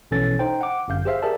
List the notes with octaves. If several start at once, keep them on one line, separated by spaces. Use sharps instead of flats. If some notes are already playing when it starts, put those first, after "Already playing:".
A#1 B2 E3 C#4 A4 A6
D#4 C5 G5
F#5 D6
G1 F#2 F5 G6
G4 G#4 C5 E5 F5
G4 G#4 A#4 D5 E5 A5